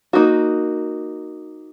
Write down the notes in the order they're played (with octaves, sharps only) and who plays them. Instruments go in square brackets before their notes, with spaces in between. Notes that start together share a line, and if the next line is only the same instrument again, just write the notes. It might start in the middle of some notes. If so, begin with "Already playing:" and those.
[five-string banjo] A#3 D#4 F#4